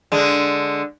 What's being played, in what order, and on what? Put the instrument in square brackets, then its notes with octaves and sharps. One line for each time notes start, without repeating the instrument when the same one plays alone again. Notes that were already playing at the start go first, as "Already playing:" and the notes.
[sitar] D3 G#3